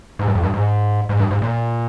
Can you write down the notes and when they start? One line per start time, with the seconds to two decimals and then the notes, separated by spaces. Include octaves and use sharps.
0.19 G#2
0.28 G2
0.35 F2
0.43 G2
0.54 G#2
1.09 G#2
1.20 G2
1.31 G#2
1.42 A#2